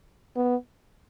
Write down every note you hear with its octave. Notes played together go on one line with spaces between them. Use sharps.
B3